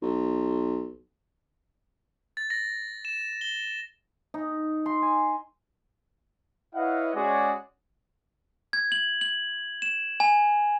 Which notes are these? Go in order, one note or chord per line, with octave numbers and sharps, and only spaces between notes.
B1
A6
A#6
E7
G7
D#4
C6
G#5
E4 B4 C#5 D#5 F5 F#5
G#3 C#4 F#4 G#4 C#5 D5
G#6
F#7
F#7
E7
G#5